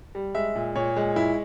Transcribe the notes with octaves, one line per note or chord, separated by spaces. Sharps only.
G3
G#3 E5
A#2
A#2 C#5
G#3
E4